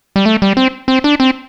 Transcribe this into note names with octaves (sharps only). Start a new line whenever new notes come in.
G3
A3
G3
C4
C4
D4
C4